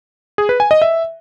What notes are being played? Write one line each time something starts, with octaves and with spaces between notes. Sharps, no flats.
G#4
B4
G#5
D#5
E5